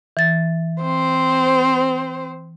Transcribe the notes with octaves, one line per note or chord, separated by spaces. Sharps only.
E3 A6
C4 C5